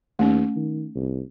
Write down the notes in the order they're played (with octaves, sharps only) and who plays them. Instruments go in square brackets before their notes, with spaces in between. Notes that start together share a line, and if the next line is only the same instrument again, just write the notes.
[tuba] D#2 [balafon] A3 C#4
[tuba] D#3
C2